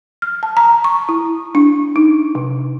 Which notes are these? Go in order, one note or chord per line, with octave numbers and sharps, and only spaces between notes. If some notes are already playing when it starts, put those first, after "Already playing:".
F6
A5
A#5
C#6
E4
D4
D#4
C3